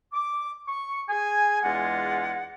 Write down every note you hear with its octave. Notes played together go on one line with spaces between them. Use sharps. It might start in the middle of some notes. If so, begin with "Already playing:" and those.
D6
C#6
G#4 G#5
E2 G#3 D4 F4 F#5